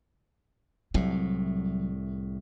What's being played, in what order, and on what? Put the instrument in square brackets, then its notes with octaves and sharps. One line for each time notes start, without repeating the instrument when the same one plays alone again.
[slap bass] C2 A2 [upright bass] F#3